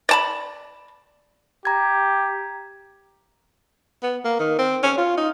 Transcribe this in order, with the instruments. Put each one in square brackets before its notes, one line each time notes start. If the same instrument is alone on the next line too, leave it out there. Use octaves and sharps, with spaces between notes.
[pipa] D5 A5 B5
[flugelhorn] G4 [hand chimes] A#5 G#6
[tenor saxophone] B3
A#3
D#3
C4
C#4
F4
D#4